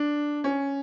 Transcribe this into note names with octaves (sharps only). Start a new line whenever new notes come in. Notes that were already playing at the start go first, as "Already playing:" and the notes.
Already playing: D4
C#4